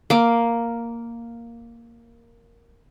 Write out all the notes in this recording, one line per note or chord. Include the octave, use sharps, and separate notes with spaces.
A#3 D6